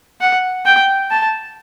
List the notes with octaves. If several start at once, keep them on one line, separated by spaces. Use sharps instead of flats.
F#5
G5
A5